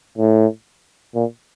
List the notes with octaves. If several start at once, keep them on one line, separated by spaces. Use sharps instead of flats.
A2
A#2